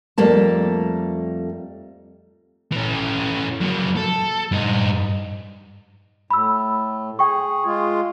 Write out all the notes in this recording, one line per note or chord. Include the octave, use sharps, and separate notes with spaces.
F2 G3 A3 A#3 A5
E3 C#4
F#3 A#3
A4
G2 D#4
A2 B5 E6
G#4 G5 C#6
G#3 F4